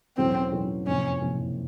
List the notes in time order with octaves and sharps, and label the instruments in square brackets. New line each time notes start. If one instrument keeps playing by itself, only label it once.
[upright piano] E2 B2 F#3 A3 C#4 [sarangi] C4
[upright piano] E2 B2 F#3 A3 C#4
[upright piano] F#1 F2 C3 [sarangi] C#4
[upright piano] F#1 F2 C3